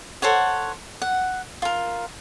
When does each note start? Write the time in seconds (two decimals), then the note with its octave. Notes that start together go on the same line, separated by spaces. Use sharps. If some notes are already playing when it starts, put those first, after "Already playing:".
0.22 A4 C5 C#5 F#5
1.02 F#5
1.62 F4 A#4